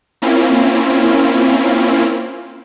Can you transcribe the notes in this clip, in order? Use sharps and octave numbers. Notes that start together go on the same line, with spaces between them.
A#3 C4 C#4 E4 F4